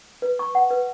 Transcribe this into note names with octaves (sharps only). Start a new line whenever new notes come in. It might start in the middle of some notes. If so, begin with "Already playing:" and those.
B4
C#6
F#5
B4